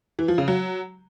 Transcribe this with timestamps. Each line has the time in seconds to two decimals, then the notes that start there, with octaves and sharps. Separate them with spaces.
0.19 E3
0.28 F3
0.38 C#3
0.48 F#3